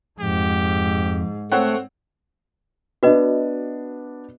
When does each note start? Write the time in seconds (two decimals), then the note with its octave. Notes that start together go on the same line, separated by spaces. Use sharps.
0.20 F2 G#2 G4
1.52 A3 C4 C#5 F#5
3.03 B3 D4 F#4 B4 D#5